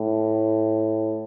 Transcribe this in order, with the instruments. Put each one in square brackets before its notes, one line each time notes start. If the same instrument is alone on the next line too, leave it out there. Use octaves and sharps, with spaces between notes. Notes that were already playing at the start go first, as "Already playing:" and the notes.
Already playing: [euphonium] A2